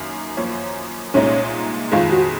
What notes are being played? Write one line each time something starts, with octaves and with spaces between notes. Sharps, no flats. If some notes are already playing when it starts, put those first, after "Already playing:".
Already playing: F#2 D#3 A#3
F#2 F3 A#3 C#4
C2 A#2 G#3 C#4 D#4
F2 D#3 G#3 F4
F#4